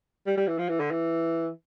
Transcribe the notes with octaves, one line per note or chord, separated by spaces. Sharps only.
G3
G3
E3
F3
E3
D3
E3